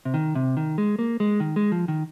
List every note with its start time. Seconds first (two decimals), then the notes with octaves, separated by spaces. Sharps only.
0.05 C3
0.14 D#3
0.35 C3
0.57 D#3
0.78 G#3
0.99 A#3
1.20 G#3
1.40 D#3
1.56 G#3
1.72 F3
1.88 D#3